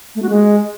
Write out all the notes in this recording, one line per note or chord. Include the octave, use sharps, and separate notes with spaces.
A3
F#4
G#3